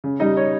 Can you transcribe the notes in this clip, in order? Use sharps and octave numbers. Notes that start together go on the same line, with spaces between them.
C#3
G3 D#4 D#5
C#5